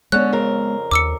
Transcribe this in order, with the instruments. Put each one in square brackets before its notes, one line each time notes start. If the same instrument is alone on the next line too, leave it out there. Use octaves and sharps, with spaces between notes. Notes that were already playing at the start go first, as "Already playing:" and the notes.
[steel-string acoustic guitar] D3 C#4 [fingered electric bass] G#3 B3 [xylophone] F#6
[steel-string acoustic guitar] F2 C#3 A#4
[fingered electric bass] D#2 [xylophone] D6 E6 C#7